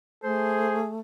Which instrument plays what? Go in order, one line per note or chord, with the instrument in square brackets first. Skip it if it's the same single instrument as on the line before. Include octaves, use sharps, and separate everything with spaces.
[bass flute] A3 [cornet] G#4 [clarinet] C5